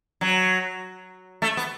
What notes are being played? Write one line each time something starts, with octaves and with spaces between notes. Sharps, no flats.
F#3
A3
B3